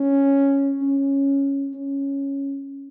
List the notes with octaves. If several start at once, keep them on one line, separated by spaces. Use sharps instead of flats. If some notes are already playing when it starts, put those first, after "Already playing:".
Already playing: C#4
C#4
C#4